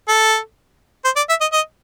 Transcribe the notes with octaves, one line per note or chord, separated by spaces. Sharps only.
A4
C5
D5
E5
D#5
D#5